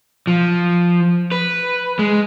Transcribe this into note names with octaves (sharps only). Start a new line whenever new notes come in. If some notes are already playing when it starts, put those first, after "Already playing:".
F3
B4
G#3